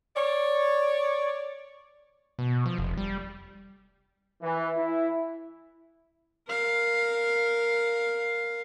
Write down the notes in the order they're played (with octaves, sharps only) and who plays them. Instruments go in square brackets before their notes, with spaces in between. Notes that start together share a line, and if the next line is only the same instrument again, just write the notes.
[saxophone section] C#5 D5
[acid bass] B2
F3
F1
G3
[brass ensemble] E3
E4
[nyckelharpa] A#4 F5